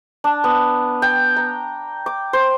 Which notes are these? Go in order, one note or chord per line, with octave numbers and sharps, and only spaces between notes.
D4
B3
G5
A#5
D6
C5